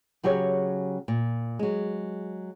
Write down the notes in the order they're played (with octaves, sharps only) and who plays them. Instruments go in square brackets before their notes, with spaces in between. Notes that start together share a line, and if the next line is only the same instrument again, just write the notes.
[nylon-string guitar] C#3 F#3 G4 G#4 C#5
A#2
F#3 G#3